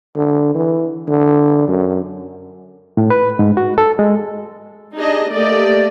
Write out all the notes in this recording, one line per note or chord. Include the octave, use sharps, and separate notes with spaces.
D3
E3
D3
F#2
A2
B4
G#2
F#4
A4
G#3
D4 D#4 G4 G#4 D#5
A3 A#3 G4 D5 D#5